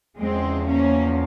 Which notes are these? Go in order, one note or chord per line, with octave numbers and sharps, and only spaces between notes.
E2 C#3 F3 G#3 C4
A#3 C#4